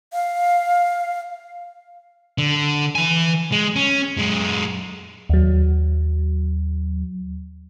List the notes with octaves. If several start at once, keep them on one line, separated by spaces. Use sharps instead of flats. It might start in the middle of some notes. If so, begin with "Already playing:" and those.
F5
D3
E3 G#5
G#3
C#4
F#2 G#3
D#2 F#3